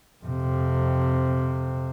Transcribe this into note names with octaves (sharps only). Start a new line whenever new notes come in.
F2 C3